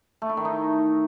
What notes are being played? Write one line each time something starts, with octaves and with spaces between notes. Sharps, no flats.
A3
E4
D#3
D#4